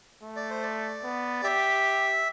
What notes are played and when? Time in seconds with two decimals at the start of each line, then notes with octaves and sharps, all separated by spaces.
0.23 A3
0.36 D5
0.50 C5
0.63 D5
1.04 B3
1.43 G4 E5